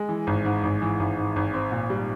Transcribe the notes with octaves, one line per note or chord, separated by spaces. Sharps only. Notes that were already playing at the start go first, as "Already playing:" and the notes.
Already playing: G#3
E3
G#1
G#2
G#1
E3
G#1
G#2
G#1
C4
A#2
G3